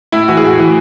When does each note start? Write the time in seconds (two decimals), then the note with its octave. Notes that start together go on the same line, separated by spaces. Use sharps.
0.12 A2 E4
0.28 E3 F#4
0.37 G#4
0.43 A2 F#4
0.58 E3